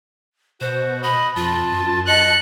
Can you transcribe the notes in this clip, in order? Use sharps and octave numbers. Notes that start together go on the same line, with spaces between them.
B2 F#4 C5
D#5 B5
F2 F4 A5
F#2
D#5 F#6 C#7